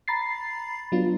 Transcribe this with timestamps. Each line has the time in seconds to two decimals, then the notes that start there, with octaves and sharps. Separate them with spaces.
0.08 A#5 B5 A6 C7
0.92 F#3 B3 D4 F4